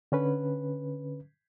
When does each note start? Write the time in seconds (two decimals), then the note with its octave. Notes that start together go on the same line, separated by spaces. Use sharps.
0.12 D3 C#4 B4